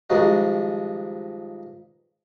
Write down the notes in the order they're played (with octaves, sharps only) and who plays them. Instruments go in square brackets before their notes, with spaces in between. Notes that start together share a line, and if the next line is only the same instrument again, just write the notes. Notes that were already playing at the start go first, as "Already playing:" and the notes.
[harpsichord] G2 D#3 F3 G#3 D#4 F#4